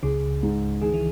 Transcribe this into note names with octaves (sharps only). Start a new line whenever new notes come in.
C#2 C#3 G#4
G#2
D#3 G#4
E3